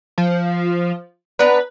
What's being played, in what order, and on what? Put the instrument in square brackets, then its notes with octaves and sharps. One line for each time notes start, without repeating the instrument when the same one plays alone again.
[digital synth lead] F3
[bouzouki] B3 D4 A#5 [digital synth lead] B4